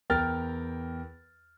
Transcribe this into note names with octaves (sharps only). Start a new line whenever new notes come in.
E2 A#4 G5 F6 A6